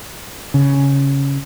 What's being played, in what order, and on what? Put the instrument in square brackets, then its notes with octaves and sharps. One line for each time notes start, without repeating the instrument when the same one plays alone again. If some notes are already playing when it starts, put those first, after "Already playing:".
[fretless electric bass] C#3